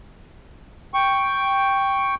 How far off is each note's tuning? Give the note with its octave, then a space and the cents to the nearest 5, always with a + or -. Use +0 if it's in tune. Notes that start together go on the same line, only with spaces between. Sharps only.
G5 +0 C#6 +0